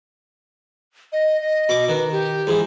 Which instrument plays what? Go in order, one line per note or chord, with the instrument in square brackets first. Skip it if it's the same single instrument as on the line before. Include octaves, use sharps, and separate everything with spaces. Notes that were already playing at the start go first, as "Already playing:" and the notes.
[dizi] D#5
D#5
[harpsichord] B2 D6
[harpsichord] D#3 [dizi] B4
[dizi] G4
[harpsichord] G#2 E3